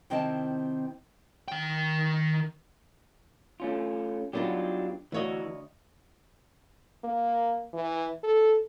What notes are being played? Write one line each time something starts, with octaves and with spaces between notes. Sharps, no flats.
C3 D#3 C4 E4 D#5 A5
D#3 G5
A3 C#4 F4
F#3 B3 D4 D#4 F4 G4
D2 E3 F#4 C#5 D#5
A#3
E3
A4